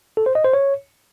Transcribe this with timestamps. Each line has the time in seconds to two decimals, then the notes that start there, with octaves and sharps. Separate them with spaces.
0.17 A4
0.26 C5
0.35 D#5
0.44 C5
0.53 C#5